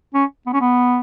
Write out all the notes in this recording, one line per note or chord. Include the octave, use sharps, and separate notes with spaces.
C#4
B3
C#4
B3